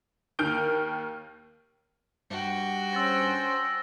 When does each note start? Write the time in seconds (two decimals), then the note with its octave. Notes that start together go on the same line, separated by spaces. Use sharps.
0.39 D#2 D#3 F6 G6 D7
2.30 G2 F#4 G5
2.93 C#4 C5 E6 A6 A#6